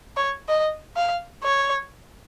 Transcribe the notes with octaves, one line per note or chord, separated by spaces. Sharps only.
C#5
D#5
F5
C#5